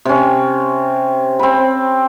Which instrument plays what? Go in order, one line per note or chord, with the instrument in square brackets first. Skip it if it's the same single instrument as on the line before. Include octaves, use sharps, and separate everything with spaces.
[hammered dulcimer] C3 C#4
C4 B5